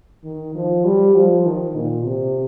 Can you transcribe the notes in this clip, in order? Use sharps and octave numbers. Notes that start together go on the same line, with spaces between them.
D#3
F3
G3
F3
D#3
A#2
C3